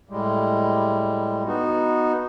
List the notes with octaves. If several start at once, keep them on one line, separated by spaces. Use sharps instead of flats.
A2 G3 G#3
B3 D#4 F#4